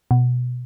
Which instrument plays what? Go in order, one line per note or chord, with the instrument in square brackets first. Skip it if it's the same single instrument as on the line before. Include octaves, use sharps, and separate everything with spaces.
[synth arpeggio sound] B2